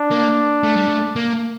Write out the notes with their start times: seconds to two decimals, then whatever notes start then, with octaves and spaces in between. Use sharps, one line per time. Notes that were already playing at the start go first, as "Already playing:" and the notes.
Already playing: D4
0.11 A#3
0.63 A3
0.76 G3
0.88 A3
1.16 A#3